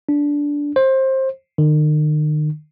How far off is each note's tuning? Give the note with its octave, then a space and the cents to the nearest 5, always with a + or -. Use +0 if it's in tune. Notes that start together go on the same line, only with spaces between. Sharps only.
D4 -15
C5 +20
D#3 -40